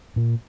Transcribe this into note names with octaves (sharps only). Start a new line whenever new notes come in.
A#2